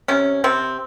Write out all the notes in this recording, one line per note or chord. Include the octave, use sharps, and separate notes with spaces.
C3 C#4
C3 C4